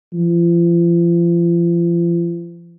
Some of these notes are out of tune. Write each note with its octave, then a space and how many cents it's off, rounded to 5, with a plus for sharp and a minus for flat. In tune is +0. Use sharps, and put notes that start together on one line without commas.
F3 -40